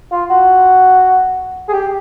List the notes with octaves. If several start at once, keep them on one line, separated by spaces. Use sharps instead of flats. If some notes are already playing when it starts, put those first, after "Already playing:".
F4
F#4
G#4
G4